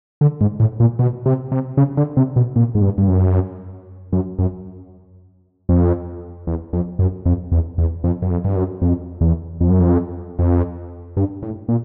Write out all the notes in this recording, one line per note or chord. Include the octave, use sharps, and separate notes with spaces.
D3
G#2
A2
A#2
B2
C3
C3
C#3
D3
C3
B2
A#2
G#2
G2
G2
F#2
F#2
F#2
F2
E2
F2
F#2
F2
E2
E2
F2
F#2
F2
G2
F#2
F2
E2
F2
F#2
F2
F2
G2
A2
A#2